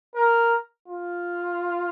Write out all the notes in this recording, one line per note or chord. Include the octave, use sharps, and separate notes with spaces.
A#4
F4